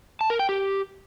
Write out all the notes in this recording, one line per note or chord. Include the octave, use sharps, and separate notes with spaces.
A5
A#4
G5
G4